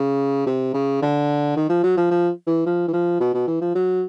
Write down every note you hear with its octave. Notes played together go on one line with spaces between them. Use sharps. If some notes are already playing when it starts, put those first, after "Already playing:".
Already playing: C#3
C3
C#3
D3
D#3
F3
F#3
F3
F3
E3
F3
E3
F3
B2
B2
E3
F3
F#3